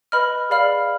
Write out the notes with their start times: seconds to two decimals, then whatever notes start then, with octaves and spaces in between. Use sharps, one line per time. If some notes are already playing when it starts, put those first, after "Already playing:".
0.12 B4 D#5 B5 F6
0.50 G#4 D5 F5 B5 F6